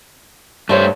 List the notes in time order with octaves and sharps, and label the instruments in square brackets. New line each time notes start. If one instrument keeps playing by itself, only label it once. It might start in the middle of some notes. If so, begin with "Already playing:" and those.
[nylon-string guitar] G2 G4 C#5 [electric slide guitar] A3 C5